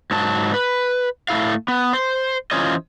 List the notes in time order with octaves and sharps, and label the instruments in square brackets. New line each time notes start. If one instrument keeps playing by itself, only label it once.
[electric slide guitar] G#2 F#3 A5
B4
A2 A3 E4 F5
B3
C5
E3 C#4 F4 C5 C#5 D#5